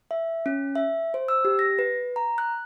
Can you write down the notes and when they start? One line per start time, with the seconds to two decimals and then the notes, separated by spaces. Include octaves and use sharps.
0.11 E5
0.46 C#4
0.75 E5
1.14 C5
1.28 E6
1.45 G4
1.59 A#6
1.79 B4
2.16 A#5
2.38 F#6